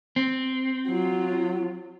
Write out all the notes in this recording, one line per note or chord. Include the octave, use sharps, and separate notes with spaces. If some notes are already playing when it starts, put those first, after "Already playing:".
C4
F#3 F4